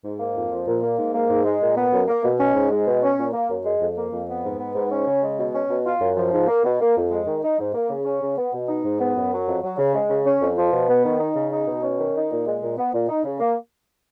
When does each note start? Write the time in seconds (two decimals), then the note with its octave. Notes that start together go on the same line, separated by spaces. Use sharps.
0.04 G#2
0.19 A#3
0.36 F2
0.52 F3
0.67 A#2
0.83 A#3
0.98 G#2
1.14 A#3
1.29 G#2
1.45 G#3
1.61 A#2
1.77 B3
1.93 F#2
2.08 A#3
2.24 B2
2.39 C#4
2.55 G#2
2.71 G#3
2.87 B2
3.03 C#4
3.18 A#2
3.33 A#3
3.50 F#2
3.65 G#3
3.81 F2
3.97 A#3
4.13 F2
4.28 B3
4.45 G#2
4.60 B3
4.75 G#2
4.91 C#4
5.07 C#3
5.23 G#3
5.38 B2
5.55 C#4
5.69 B2
5.86 F4
6.01 F#2
6.17 F3
6.33 G#2
6.48 A#3
6.64 B2
6.81 A#3
6.96 F2
7.11 G#3
7.27 D#3
7.43 D#4
7.59 G#2
7.75 A#3
7.90 C#3
8.05 C#4
8.22 C#3
8.38 B3
8.53 B2
8.69 D#4
8.84 G#2
9.01 B3
9.16 F#2
9.32 F#3
9.48 F2
9.63 F#3
9.78 C#3
9.95 G#3
10.10 C#3
10.26 C#4
10.42 F2
10.58 F3
10.73 B2
10.89 B3
11.04 D#3
11.20 D#4
11.36 C#3
11.52 D#4
11.67 B2
11.83 C#4
11.99 D#3
12.15 D#4
12.31 A#2
12.46 G#3
12.63 A#2
12.78 B3
12.94 A#2
13.09 D#4
13.24 C#3
13.40 A#3